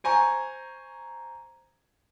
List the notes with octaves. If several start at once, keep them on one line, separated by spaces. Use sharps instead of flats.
C5 G#5 A#5 C#6